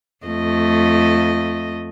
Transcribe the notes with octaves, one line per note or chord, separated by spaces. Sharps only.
F2 A3 D#5